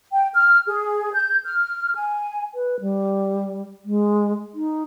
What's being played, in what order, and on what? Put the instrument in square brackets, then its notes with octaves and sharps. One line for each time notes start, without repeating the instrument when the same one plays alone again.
[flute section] G5
F6
G#4
G6
F6
G#5
[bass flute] B4
G3
G#3
D#4